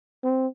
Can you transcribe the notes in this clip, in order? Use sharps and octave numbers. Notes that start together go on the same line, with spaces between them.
C4